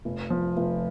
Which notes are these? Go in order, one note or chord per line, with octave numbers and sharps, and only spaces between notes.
F1
F3
F1